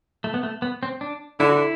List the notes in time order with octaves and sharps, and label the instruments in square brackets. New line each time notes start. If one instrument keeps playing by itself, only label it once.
[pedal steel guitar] A3
B3
A3
B3
C4
D4
[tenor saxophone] D3 [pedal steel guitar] E4
[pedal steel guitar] F#4
E4